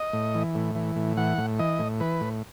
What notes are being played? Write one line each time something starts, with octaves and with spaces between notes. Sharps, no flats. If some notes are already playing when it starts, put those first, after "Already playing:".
Already playing: D#5
A2
E3
A2
E3
A2
E3 F#5
A2
E3 D#5
A2
E3 B4
A2